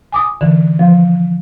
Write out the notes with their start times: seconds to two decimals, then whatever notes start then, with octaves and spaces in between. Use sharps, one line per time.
0.12 G#5 D6 D#6
0.41 D3 E3
0.79 F3